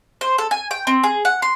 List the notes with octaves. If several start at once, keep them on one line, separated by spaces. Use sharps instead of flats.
C5
A4
G#5
G5
C4
G#4
F#5
C6